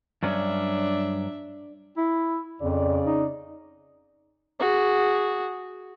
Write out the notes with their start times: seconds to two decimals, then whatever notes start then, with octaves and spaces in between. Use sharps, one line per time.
0.23 G2 F#3 C#4 D4 E5
1.97 E4
2.62 F2 C#3 D5
3.06 D#4
4.60 F#4 G#4